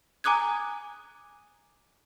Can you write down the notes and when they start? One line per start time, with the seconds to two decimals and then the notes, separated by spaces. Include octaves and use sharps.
0.24 G#5 A#5 D6 D#6 F#6 G#6